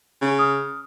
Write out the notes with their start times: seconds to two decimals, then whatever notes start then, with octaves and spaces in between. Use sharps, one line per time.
0.22 C#3
0.38 D#6 F6